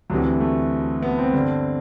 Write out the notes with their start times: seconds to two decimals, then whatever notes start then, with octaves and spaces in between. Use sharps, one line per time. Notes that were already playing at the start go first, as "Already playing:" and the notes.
0.10 D2 C3 E3 F#3
0.40 A3
1.03 B3
1.19 C4
1.34 G2 D3